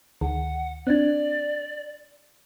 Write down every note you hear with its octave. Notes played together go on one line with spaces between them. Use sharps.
D2 D#3 F#5
C4 D4 D5